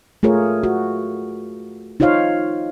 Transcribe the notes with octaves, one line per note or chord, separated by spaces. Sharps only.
A3 F4 G#4 A#4 C#5
F#4
D#4 F4 C5 C#5 F5